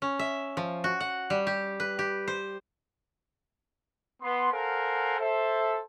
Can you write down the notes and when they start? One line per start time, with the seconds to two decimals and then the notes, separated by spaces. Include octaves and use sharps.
0.02 C#4
0.19 E5
0.57 F3
0.84 F#4
1.00 F#5
1.30 G3
1.47 G4
1.80 B4
1.99 G4
2.28 C5
4.22 B3 C6
4.52 A4 A#4 C5 F5 F#5 G#5
5.20 A4 C5 E5